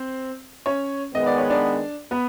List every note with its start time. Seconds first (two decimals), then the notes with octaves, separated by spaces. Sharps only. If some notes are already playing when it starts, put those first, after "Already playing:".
Already playing: C4 C5
0.66 C#4 C#5
1.14 D#3 G#3 B3 D#5
1.27 D5
1.38 C#5
1.50 D4 D5
2.11 B3 B4